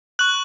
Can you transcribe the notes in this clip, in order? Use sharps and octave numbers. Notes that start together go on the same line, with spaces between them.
C#6 F#6 F#7